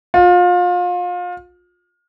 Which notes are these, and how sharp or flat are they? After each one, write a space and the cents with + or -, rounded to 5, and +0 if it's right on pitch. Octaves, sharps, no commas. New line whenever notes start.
F4 +30